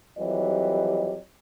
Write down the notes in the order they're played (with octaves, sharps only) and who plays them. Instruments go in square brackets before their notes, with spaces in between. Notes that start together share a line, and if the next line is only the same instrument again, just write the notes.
[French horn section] F2 E3 F#3 G3 G4 D#5